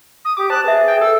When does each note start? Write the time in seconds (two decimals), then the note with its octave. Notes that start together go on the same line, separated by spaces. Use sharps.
0.24 D#6
0.37 G4 D6
0.50 C5 A5 F#6
0.64 G#4 B4 E5
0.88 G5
1.01 A4 G5 E6